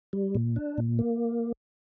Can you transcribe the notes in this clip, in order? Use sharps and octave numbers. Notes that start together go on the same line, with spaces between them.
G3
A#2
D4
A#2
A#3